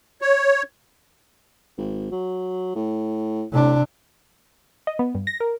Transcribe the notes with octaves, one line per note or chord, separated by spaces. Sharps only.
C#5
G#1
F#3
A2
A2 C3 D4
D#5
B3
G2
A#6
A#4